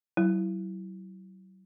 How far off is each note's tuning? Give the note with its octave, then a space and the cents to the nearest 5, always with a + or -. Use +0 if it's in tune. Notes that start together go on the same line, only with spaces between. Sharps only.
F#3 +35 E4 +0